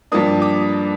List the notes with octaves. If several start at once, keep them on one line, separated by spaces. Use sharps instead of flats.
G2 F3 A#3 D4 D#6
D6